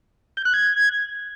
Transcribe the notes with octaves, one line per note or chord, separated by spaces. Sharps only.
G6
F#6
G#6